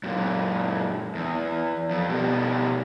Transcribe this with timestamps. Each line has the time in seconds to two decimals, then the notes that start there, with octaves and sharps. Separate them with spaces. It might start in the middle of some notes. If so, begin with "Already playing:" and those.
0.04 F#2 A#2
1.15 E2
1.90 F2
2.10 B2 G3